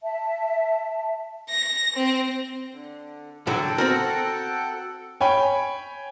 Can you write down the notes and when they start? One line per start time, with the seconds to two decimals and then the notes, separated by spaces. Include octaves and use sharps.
0.02 E5 A5
1.49 A#6
1.96 C4
2.73 D3
3.47 A2 D3 F#3 A4 F#5 G5
3.78 C4 F#4 A#4
5.21 C#5 G5 G#5 B5